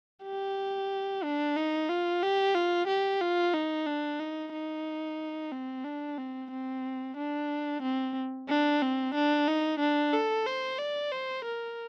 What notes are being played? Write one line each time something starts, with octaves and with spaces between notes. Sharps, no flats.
G4
D4
D#4
F4
G4
F4
G4
F4
D#4
D4
D#4
D#4
C4
D4
C4
C4
D4
C4
D4
C4
D4
D#4
D4
A4
C5
D5
C5
A#4